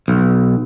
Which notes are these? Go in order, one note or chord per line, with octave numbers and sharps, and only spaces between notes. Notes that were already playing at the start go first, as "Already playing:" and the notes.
B1